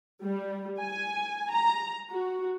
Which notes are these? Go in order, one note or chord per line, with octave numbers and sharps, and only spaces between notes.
G3
G#5
A#5
F#4